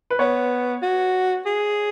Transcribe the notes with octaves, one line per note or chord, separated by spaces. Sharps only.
B4
B3 C#5
F#4
G#4